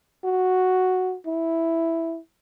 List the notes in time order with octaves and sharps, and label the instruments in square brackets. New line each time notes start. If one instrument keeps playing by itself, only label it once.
[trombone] F#4
E4